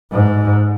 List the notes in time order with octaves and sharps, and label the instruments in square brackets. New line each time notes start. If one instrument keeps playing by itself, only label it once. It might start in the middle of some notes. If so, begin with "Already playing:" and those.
[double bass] G#2